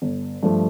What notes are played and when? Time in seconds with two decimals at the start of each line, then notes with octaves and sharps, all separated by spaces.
0.02 G1
0.43 G2 F3 A3